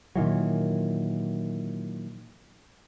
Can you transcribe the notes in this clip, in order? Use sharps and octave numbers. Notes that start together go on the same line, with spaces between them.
A#2 D#3 E3 F#3